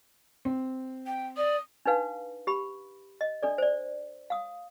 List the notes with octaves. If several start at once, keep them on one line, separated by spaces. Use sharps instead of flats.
C4
G5
D5 D#6
D4 D#4 B4 F5
G4 B5
D#5
D4 A4 D5
C5 D5
F5 D#6